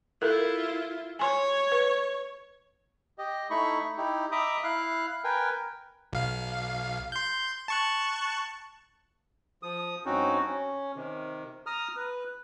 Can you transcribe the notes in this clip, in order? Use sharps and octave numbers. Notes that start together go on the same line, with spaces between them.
E4 F4 A4 A#4
C#5 G#5 C6
B4
G4 D#5
A3 D#4 E4 B5 C#6
D#4 E4 G4
D#5 E5 A#5 B5 D6 D#6
E4 F5 F#6
A#4 B4 G5 G#5
B1 F5
C6 G6
A5 C#6 F#6
F3 D#6
G2 C4 C#4 D#4 F#4
C#4
C3 D#3
A#5 D#6 F6
B4